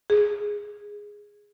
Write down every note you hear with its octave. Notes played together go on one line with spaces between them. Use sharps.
G#4